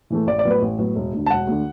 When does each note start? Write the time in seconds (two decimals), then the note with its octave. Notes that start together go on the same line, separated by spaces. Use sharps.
0.10 A2 E3 A3
0.27 A1 D5
0.39 D5
0.45 A2 F#3 B3
0.50 B4
0.62 A1
0.78 A2 F#3 B3
0.96 E1
1.13 D2 D3
1.26 A5
1.30 E1 F#5
1.47 D2 D3